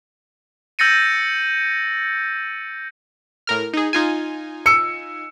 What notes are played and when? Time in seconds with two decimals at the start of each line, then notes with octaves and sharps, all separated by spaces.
0.79 E6 G6 A6 A#6 C#7 D#7
3.47 A2 A#4 F6
3.73 D#4 G#4
3.93 D#4 F4 G#5
4.66 E6 C#7